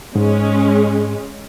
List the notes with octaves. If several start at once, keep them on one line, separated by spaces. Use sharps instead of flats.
G#2 G#3 C#4